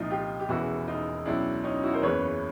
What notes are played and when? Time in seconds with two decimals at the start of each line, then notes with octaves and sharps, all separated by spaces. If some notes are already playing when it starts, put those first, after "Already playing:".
Already playing: C2 A#2 F3 D#4 F4
0.10 F4 G4
0.40 G4
0.49 E1 E2 C#3 E3 E4 F#4
0.88 D#4 F4
1.25 C#2 B2 F#3 D4 E4
1.64 C#4 D#4
1.83 E4 F#4
1.93 A#4 C5
2.02 F#1 E2 C#3 E3 B4 C#5